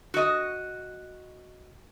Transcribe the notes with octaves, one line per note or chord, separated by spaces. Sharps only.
F#4 D#5